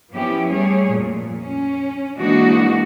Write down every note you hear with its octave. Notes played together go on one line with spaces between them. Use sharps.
F3 B3 C#4 E4 G4
G3 A3 G#4 C#5
F2 A#2
C#4
E3 G#3 A#3 D4 D#4 F#4